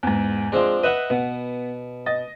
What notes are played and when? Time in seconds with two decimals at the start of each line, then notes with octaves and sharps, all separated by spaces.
0.03 E2 G#2
0.52 F3 G#3 C4 D4
0.83 B4 D#5 E5 F#5
1.10 B2 B3
2.06 D#5 A6